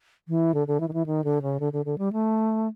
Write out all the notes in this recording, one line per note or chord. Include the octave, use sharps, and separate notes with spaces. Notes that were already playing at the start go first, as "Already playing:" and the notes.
E3
D3
D3
E3
D#3
E3
D#3
D3
C#3
D3
D3
D3
G3
A3